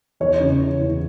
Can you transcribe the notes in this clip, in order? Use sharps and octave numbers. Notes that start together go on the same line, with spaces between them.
E2 C#5
C#3
E3
E2